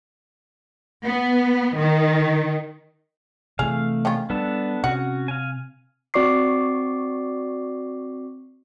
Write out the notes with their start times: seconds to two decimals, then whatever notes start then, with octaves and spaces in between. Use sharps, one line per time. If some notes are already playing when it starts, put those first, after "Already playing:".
1.05 B3
1.77 D#3
3.59 C3 E3 A3 G#4 F5
4.05 D#3 C#4 F4
4.30 G3 B3 D4 A4
4.84 C3 C#4 F#4 F#5
5.28 F5 G#5
6.14 C4 F#4 D5 C#6 D6 C7